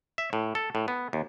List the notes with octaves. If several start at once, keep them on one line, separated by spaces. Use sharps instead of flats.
E5
A2
A4
A2
B3
D#2